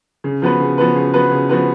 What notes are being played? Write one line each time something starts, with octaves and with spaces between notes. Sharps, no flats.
C#3
F3 B3 F#4 B4
C#3
F3 B3 F#4 B4
C#3
F3 B3 F#4 B4
C#3
F3 B3 F#4 B4